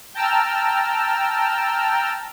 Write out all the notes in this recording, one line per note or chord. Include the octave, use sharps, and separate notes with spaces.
G5 A5 A#5 E6 F6